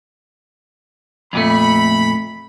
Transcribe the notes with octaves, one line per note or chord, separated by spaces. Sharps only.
F2 A#2 A3 B5